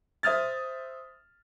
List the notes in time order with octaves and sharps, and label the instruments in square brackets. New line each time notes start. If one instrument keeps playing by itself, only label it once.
[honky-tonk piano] C5 E5 D#6 F6 A6